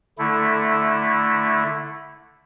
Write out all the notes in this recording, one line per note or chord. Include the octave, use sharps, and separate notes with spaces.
D3 A3 E4